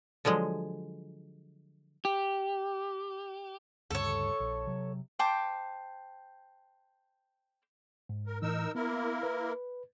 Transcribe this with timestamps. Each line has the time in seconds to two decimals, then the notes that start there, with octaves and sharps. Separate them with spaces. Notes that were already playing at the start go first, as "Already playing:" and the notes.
0.25 D3 F3 F#3 G#3
2.05 G4
3.91 D2 G2 C#3 A4 C#5
4.40 A#1
4.67 C3 F#3
5.19 C5 G5 A5 D6
8.09 G#2
8.27 A#4
8.42 A2 E3 D#4 A#4 E6
8.75 A#3 B3 E4 A#4
9.23 B4